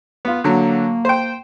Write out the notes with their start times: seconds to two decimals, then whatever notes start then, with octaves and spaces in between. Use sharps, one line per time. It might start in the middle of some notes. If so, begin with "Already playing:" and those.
0.25 B3 F4
0.44 D3 F#3 A#3
1.05 C5 G5